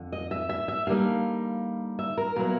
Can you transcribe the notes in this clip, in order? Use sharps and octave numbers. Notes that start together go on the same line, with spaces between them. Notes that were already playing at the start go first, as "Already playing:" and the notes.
Already playing: F2 D3
D#5
E5
E5
E5
D3 G3 A#3 D#4 F5
E5
A#4
A#2 F#3 B3 E4 A#4